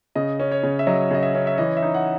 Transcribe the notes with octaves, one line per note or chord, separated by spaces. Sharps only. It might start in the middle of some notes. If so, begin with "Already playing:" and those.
C#3 D#5
C#4
C#5
C#3
E5
F#3 D#5
C#3 D#5
E5
C#4
E5
E3 D#5
E5
D#4
F#5